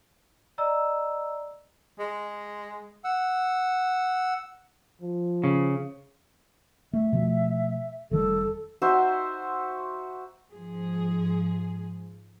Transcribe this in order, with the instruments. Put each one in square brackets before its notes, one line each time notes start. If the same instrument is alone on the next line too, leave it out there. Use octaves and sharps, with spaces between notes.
[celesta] D5 D#5 A#5 E6
[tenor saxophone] G#3
[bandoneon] F#5 E6
[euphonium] F3
[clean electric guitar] C#3
[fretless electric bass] A3 [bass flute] E5
[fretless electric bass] B2 F3 A3
[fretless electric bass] F1 D#3 G3 [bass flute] A4
[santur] D#4 F#4 C5 E5
[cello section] G#2 F3 G#4